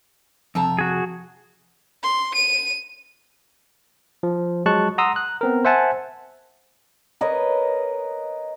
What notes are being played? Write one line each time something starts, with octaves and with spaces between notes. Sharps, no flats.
F2 C3 E5 A5 A#5
F#4 G#4
C6
D#7
F3
F#3 G#3 A5 C#6 F#6
F#5 A#5 C6 D#6 E6
F#6
B3 C4 A#4
C5 E5 F#5 G#5 A5
A#4 B4 C#5 D#5